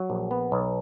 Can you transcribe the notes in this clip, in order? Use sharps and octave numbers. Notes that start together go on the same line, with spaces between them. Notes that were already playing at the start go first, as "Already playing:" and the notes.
Already playing: F#3
A#1
B3
B1